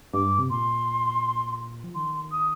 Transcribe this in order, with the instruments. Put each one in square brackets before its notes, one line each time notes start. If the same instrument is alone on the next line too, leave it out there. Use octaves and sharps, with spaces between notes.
[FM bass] G2 [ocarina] D6
[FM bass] C3
[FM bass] A#2 [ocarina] C6
[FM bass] F3
[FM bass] D#3 [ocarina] C6
[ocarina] D#6